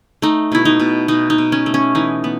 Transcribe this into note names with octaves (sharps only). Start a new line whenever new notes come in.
A3 D#4
B2 E4
D#4
B2
B2 D#4
D#4
B2
C#4
A3
C#4
E3 D#4
B3